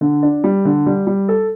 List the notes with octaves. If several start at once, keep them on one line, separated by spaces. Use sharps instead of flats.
D3
D4
G3
D3
G3
G3
A4